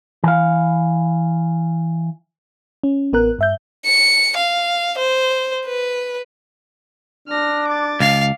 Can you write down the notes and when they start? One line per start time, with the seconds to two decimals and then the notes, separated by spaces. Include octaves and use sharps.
0.24 E3 F5
2.84 C#4
3.13 A1 B3 A#4 F#6
3.39 G2 E5 G6
3.86 C#7
4.37 F5
4.98 C5
5.66 B4
7.28 D4 F6 A#6
7.68 D6 A6
8.00 C#2 F5